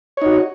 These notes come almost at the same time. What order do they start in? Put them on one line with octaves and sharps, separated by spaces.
C#5 D#4 F#4